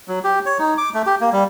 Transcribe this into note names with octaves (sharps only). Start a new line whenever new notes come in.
F#3
G4
C#5
D#4
D6
A3
G4
A#3
G3